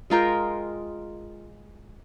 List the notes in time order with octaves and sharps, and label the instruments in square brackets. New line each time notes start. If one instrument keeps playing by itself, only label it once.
[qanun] G#3 F4 A#4 G5